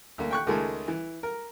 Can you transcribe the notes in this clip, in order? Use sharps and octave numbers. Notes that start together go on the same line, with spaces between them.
D2 A#3
G5 C#6 F#6
C#2 D#3 G#3 A3 A4
E3
A#4